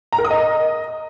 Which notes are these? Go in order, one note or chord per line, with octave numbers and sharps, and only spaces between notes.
A#5
A#4
D#6
D#5